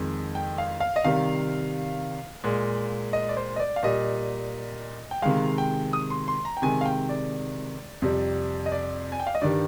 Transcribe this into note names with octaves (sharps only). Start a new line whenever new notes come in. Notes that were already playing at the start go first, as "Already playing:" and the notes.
Already playing: F2 D#3 G#3
G5
F5
F5
D#5
C3 D#3 G3 F5
A#2 G#3
D#5
D5
C5
D#5
D5
F5
A#2 G3 D#5
G5
C3 D#3 G#3 F5
G5
D#6
C6
C6
A#5
G5
C3 D#3 G#3 G#5
F5
G5
D5
F2 C3 G3
D#5
D5
G#5
G5
F5
D#5
G2 D#3 G3 D5